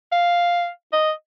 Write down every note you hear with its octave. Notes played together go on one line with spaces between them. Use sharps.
F5
D#5